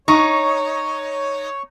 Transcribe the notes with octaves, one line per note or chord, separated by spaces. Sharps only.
D#4 C#5 C#6